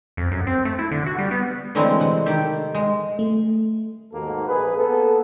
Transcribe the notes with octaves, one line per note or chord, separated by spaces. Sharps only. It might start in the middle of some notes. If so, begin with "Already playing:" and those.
F2
F#2
C4
A3
E4
D3
F#4
G3
B3
D3 E3 F#3 G#3 A3 C4
C3 F#5
D#3 G4 A4
G#3
A3
D#2 G#2 A#3 F#4 A4
A#1 G#4 B4
A#3 B3 A4